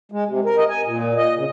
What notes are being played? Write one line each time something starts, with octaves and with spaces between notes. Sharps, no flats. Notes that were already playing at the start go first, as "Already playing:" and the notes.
G#3
C3
A#4
D#5
G#5
A#2
D#5
C#3